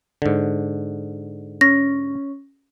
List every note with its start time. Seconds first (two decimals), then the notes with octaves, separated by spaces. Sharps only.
0.22 G#2 D3
1.61 C#4 A#6